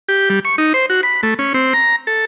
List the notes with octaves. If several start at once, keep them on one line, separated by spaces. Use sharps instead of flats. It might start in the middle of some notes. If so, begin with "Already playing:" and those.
G4
G3
C#6
D#4
C5
F#4
B5
A3
C#4
C4
A#5
A4